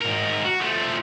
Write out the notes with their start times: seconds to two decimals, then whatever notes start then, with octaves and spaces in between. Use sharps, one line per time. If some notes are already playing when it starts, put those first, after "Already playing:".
0.01 G#2 A#4
0.44 F#4
0.60 F3 A3